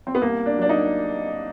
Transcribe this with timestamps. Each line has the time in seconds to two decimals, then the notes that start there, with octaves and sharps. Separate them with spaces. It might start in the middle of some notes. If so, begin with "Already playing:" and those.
0.07 C4
0.15 B3
0.22 C2 A#3
0.46 D4
0.57 F#3 D4
0.69 D#4